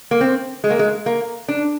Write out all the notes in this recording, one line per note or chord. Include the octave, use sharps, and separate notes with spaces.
A#3
C4
G#3
A#3
G#3
A#3
D4